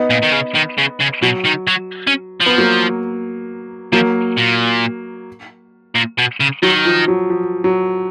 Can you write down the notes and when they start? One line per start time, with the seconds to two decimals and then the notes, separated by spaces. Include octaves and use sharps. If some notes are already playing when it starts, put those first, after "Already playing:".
Already playing: B3 D#4
0.10 A#2
0.23 D#3
0.32 C#3
0.55 D#3
0.78 C#3
1.00 C#3
1.22 B2 F#3
1.45 D#3
1.68 F#3
2.07 C#4
2.41 F3
2.46 B3
2.58 F#3 A#3
3.92 F3 F#3 A#3
4.38 A#2
5.95 A#2
6.18 B2
6.40 C#3
6.62 D#3 F#3
6.85 F3
7.08 F#3
7.30 F3
7.64 F#3